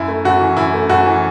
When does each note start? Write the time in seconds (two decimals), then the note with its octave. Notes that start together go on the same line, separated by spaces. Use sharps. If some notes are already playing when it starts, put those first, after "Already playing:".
Already playing: F#2 E4
0.08 A3
0.24 F#2 F#4
0.41 E3
0.57 F#2 E4
0.74 A3
0.89 F#2 F#4
1.06 E3